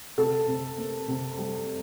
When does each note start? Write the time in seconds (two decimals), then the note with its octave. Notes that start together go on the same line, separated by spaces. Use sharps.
0.18 C3 A4
0.48 C3
0.78 A#3
1.08 C3
1.38 G3